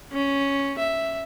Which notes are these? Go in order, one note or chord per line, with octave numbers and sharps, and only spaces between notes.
C#4
E5